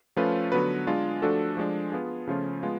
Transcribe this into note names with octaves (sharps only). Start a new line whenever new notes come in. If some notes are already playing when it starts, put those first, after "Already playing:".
F3 A3 C#4 F4 B4
D3 F#3 B3 F#4 B4
G#3 D4 F4
F3 A3 D4 F#4 A4
F3 G#3 D4
B3 F4 G#4
C#3 F3 A3 C#4 F4
G#3 B3 F4